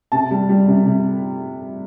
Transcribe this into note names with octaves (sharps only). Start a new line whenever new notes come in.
C3 A5
G3
G3
C3
C3